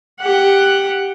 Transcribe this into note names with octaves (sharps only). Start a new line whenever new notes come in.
G4 F#5